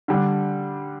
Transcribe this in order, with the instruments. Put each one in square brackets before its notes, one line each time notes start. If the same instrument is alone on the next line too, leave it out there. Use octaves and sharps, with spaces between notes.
[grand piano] D3 G3 D4